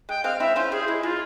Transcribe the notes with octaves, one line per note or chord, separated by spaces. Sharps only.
G#3 G5
G#3 C4 F5
C4 E4 E5
C#4 F4 C5
G3 G#4
G#3 E4
G#3 F4